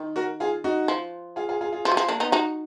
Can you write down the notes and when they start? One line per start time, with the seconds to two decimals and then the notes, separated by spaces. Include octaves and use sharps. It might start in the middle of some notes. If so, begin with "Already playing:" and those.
Already playing: D#3
0.16 F#4 A#4
0.40 F4 G#4
0.64 D#4 F#4
0.88 F3
1.36 F4 G#4
1.49 F4 G#4
1.61 F4 G#4
1.72 F4 G#4
1.85 F3
1.92 F#3
1.97 F3
2.08 A#3 D4
2.20 B3 D#4
2.32 D#4 F#4